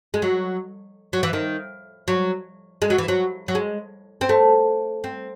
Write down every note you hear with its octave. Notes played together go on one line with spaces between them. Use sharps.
G#3
F#3
F#3
E3
D#3
F#3
G#3
F#3
E3
F#3
F#3
G#3
C4
A3
C4